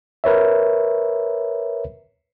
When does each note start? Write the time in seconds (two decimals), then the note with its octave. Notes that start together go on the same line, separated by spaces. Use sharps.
0.24 A#4 B4 C#5 E5